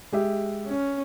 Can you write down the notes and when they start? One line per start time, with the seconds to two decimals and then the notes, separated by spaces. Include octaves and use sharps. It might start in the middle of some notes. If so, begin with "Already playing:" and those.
0.12 G#3 G4 E5
0.67 C#4